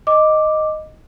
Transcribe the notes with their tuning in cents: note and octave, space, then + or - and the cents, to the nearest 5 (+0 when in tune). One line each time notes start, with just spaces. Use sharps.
D#5 +0 D6 +0